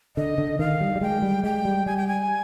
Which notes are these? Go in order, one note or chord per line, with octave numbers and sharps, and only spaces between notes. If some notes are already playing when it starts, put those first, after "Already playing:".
D3 D#5
D3
D#3 F5
G3
G3
G#3 G5
G3
G#3 G5
G3
G3 G#5
G5
G#5